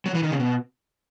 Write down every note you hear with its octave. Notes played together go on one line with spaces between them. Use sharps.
F#3
E3
D#3
C#3
B2